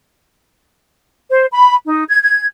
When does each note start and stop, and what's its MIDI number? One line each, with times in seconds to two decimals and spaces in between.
1.30 1.46 72
1.51 1.74 83
1.86 2.04 63
2.09 2.20 92
2.23 2.46 92